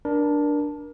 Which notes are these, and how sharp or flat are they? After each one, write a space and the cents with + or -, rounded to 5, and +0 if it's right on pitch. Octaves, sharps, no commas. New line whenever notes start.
D4 +0 A#4 +25